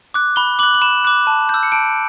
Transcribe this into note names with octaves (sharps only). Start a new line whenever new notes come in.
D6 F#6
B5 G7
D6 F#6 F#7
F#7
B5 E7
D6 F#6
A5
E6 G6
C#7
A5 D7